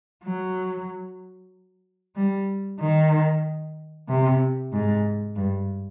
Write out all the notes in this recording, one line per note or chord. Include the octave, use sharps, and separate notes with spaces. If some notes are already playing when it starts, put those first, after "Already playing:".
F#3
G3
D#3
C3
G#2
G2